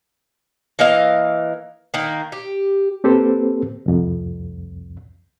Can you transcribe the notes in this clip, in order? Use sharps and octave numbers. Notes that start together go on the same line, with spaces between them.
E3 A#3 D#5 F5
D#3 A#3
G4
A#3 C4 G4 A4 B4 C5
C2 F2